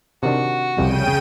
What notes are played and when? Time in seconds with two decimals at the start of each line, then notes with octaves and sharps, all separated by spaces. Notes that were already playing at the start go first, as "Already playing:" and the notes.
0.23 C3 D#3 D4 F#4
0.78 C2 F2 C#3 G3 G5 D#7